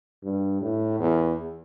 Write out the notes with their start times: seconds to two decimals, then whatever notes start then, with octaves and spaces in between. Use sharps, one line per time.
0.23 G2
0.61 A2
0.99 E2